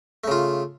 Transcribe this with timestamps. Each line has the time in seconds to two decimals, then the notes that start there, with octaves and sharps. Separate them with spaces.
0.24 A3
0.28 C#3
0.31 F4